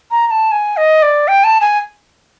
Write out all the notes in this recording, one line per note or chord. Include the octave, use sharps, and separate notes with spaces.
A#5
A#5
A5
G#5
D#5
D5
G5
A5
G#5